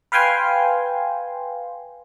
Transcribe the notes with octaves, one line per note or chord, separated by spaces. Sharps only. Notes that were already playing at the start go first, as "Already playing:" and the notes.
B4 F5 G5 G#5 C6